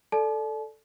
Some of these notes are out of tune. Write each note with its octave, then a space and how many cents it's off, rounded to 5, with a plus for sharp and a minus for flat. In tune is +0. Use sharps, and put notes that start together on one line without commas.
A4 +0 D5 +0 A5 -40